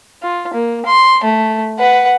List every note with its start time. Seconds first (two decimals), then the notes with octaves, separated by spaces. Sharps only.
0.23 F4
0.54 A#3
0.86 C6
1.24 A3
1.79 B4 F#5